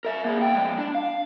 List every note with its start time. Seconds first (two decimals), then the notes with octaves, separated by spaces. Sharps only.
0.05 A#4 E5
0.25 A#3 G#4
0.39 A#3 G5
0.55 F3 G#3
0.78 D4
0.95 F5